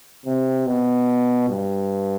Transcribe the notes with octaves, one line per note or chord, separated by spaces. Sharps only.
C3
B2
G2